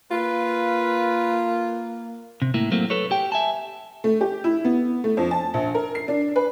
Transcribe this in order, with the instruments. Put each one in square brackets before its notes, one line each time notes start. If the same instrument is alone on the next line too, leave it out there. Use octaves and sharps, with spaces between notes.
[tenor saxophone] A#3 [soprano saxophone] F4 [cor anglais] B4
[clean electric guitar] C3
A2 A#3 E4
F#3 A3 A#3 C4
A4 B4 C#5
G4 G5
E5 G#5 A5
[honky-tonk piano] A3
G4
E4
B3
A3
F2
A5
A#1
A#4
C7
D4
B4